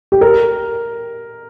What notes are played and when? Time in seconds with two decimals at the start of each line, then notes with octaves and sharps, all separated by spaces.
0.12 G4
0.21 A#4